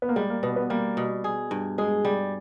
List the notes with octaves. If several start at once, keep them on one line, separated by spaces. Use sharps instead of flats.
B3
A#3
G3 G#3
A#3
B2 B3
B3
G3 A#3
B2
G#4
G2
G#3 G#4
G3